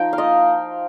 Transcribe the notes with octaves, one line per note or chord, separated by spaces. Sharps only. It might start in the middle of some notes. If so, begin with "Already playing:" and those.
Already playing: F3 D#4 G5 A#5
F5
A#3 F4 D#5